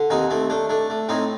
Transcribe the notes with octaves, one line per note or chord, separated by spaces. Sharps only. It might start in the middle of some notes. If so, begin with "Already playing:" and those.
Already playing: D3
D#2 C4 D#4
A3 C4
A3 D4
A3 D4
A3
A2 C4 D#4